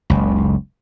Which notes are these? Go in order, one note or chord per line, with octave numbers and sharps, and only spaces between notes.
F#1 C#2